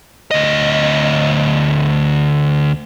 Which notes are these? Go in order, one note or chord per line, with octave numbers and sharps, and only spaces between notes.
D2 D#5